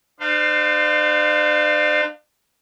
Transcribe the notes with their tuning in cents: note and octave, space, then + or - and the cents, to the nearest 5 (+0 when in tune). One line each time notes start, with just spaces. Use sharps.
D4 +40 C5 -30 F5 +0